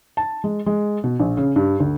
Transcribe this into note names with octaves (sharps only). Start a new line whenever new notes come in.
A5
G#3
G#3
B2
A#1
C#3
G2
D2